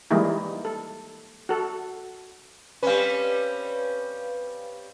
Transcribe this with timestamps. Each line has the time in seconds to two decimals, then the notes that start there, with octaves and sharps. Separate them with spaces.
0.11 E3 G3 G#3 A#3 D#4 E4
0.65 A4
1.49 F#4 A4
2.83 G3 C4 C#4 B4 F5